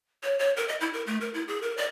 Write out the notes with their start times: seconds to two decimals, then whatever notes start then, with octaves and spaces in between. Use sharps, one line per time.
0.23 C#5
0.39 C#5
0.56 A#4
0.68 D#5
0.81 E4
0.93 A#4
1.07 A3
1.21 A#4
1.34 E4
1.48 G#4
1.62 A#4
1.77 D5